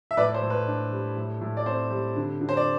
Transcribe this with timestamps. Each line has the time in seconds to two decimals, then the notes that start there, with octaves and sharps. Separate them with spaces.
0.11 E5
0.17 A2 B4 D5
0.34 C5
0.42 A2
0.50 B4
0.67 D4
0.91 G3
1.16 A2
1.41 A2
1.57 D5
1.66 C4 C5
1.91 G3
2.16 D3
2.41 D3
2.49 C5
2.57 D5